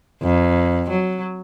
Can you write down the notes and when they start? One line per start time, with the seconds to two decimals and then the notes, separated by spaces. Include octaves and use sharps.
0.23 F2
0.90 F#3